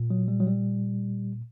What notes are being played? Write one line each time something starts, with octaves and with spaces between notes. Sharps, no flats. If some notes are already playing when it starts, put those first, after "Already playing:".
Already playing: A#2
F#3
G3
F#3
G3